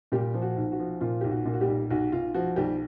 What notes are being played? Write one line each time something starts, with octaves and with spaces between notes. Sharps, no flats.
A#2 G3 G4
F3
F#4
B1
F#4
F3
A#2 F4
B1 G4
F#4
A#2
F#4
G3 G4
B1
B1 F#4
B1 F4
F3 F#4
B1 G3 G4